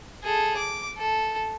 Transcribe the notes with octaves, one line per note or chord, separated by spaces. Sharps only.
G#4 A4
D6
A4